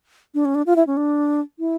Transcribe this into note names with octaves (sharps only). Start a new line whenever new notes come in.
D4
C#4
D4
F4
E4
C#4
D4
E4